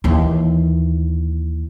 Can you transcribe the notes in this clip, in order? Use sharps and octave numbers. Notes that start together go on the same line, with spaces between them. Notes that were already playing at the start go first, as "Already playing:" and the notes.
D#2 E3